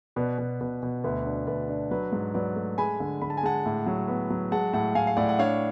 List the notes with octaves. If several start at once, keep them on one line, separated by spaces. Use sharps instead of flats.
B2 B4 D5
B2
B2 B4
B2
D2 B4
D4
D2 B4 D5
D4
F#3 B4
G#2
F#3 B4 D5
A3
G#3 G#5 B5
D3
D3 B5
A5
G#5
G#3 F#5 A5
A2
F#3
B3
F#3
G#3 F#5 A5
A2 F#5 A5
A2 F5 G#5
F5
A2 D5 F#5
F#5
D4 C#5 F5